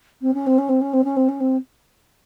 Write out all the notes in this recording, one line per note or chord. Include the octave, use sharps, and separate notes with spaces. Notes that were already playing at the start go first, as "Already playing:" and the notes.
C4
C#4
C4
C#4
C4
C#4
C4
C#4
C4
C#4
C4